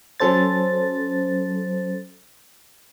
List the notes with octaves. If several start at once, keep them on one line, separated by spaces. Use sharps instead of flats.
F#3 C#4 A4 C5 A6